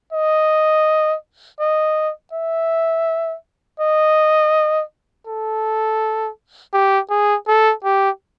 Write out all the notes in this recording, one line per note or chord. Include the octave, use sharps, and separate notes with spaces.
D#5
D#5
E5
D#5
A4
G4
G#4
A4
G4